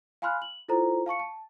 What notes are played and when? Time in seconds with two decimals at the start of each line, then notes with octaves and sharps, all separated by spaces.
0.22 F5 G#5 B5 C6 F6 F#6
0.42 F#7
0.68 E4 F4 A4 C5 A#5
1.06 F5 A5 C#6 C#7
1.20 A5